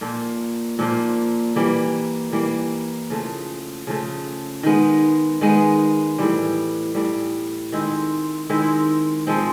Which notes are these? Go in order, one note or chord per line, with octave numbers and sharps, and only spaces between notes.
A#2 F3 A#3
A#2 F3 A#3
E3 G3 A#3
E3 G3 A#3
C#3 F3 A3
C#3 F3 A3
D#3 G#3 B3
D#3 G#3 B3
A2 E3 G3
A2 E3 G3
D#3 G#3 C4 E4
D#3 G#3 C4 E4
F3 G#3 C4